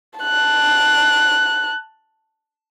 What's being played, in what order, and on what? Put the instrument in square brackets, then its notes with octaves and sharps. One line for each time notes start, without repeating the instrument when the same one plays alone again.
[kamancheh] A5 F#6